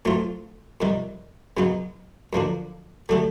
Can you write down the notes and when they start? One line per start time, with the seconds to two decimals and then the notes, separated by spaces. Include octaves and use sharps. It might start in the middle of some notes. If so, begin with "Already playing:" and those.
0.05 A2 F#3 A3 C4 F4
0.81 F2 C3 D#3 G3
1.57 F#2 C#3 F#3 B3 D#4
2.33 F#2 D3 F3 A#3 D4
3.09 D3 F#3 A3 D4 G4